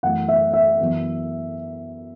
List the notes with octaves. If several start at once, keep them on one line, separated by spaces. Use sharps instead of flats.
F#2 E3 A3 E4 F#5
E5
E5
F#2 E3 B3